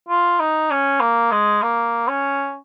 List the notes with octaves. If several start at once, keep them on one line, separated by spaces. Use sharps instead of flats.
F4
D#4
C#4
A#3
G#3
A#3
C#4